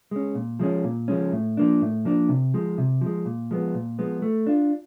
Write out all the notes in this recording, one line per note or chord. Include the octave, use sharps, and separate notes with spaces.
G#3 C#4
A#2
F3 G#3 C#4
A#2
F3 G#3 C#4
A2
F3 A#3 D4
A2
F3 A#3 D4
C3
F3 G#3
C3
F3 G#3
A#2
F3 G#3 B3
A#2
F3 G#3 B3
A3
D4 F4